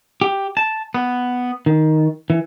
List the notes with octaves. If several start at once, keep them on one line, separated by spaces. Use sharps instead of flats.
G4
A5
B3
D#3
E3